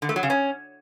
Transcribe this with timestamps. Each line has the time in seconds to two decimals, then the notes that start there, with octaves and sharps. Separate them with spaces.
0.02 D3
0.09 A3
0.16 F#3
0.23 C#3
0.30 C#4